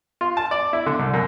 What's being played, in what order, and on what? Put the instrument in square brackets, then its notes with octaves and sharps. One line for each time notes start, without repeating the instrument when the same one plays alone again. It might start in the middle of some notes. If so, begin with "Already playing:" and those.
[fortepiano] F4
A5
D5
E4
D3
C2
F#2